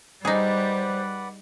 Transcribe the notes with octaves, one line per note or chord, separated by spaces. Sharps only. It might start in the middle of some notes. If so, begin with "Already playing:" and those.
G3 D#4 G#4 B4 C5 D5 F#5